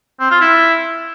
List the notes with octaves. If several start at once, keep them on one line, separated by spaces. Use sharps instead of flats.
C4
F4
E4